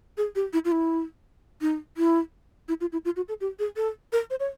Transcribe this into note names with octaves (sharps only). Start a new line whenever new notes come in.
G#4
G4
E4
F4
E4
D#4
E4
E4
F4
E4
F4
F#4
A4
G4
G#4
A4
A#4
C5
C#5